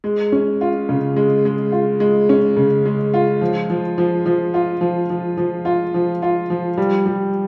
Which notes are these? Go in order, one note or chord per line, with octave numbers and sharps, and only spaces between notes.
G#3
C#4
F4
C#3
G#3
G#3
F4
G#3
C#4
C#3
G#3
F4
F3
F3
F3
F3
F4
F3
F3
F3
F4
F3
F4
F3
G3
G3